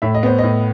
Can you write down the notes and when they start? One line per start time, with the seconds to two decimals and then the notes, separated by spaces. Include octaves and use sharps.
0.02 A2 E5
0.15 D#5
0.23 B3 C5
0.39 A2 D#5